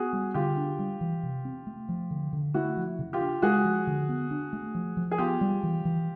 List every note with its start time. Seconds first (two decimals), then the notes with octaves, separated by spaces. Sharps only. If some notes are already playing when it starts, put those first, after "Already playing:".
Already playing: B3 F#4 G#4
0.13 G3
0.34 D3 F4 G4
0.57 D4
0.79 G3
1.01 E3
1.23 C3
1.45 C4
1.67 A3
1.89 F3
2.11 D3
2.33 D3
2.54 A3 E4 F#4
2.77 F3
2.99 C#3
3.13 F4 G4
3.21 D4
3.42 G#3 F#4 G#4
3.64 F3
3.87 D3
4.09 B3
4.31 D4
4.53 A3
4.75 F3
4.97 F3
5.11 G#4
5.18 B3 F4 G4
5.41 G3
5.63 E3
5.85 E3